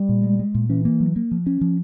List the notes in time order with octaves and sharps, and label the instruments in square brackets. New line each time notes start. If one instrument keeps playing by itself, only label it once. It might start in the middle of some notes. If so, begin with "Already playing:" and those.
Already playing: [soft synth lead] G3
[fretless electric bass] A#2
G#3
G#3
A#2
[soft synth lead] E3 [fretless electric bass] C#4
[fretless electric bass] A#3
F#3
A#3
F3
C#4
F3